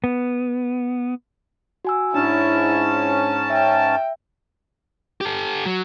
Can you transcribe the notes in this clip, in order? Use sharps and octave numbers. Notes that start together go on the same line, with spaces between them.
B3
F#4 G#5 E6
G#2 C#4 D4 E4 A5
E5 G5
G4 A4
F#3